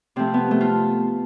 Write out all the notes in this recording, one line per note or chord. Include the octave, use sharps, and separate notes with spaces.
C3 F3 A3 C4
B3
A3
F4